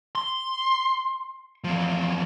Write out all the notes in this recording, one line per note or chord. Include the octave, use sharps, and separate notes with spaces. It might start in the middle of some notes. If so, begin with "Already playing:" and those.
C6
E2 F3